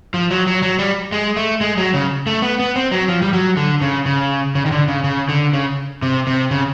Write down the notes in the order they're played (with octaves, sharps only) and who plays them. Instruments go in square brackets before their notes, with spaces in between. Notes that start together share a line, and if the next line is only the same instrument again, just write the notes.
[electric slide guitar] F3
F#3
F#3
F#3
G3
G#3
A3
G#3
F#3
C#3
A3
B3
B3
C4
F#3
F3
G3
F#3
D3
C#3
C#3
C#3
D#3
D3
C#3
C#3
D3
C#3
C3
C3
C#3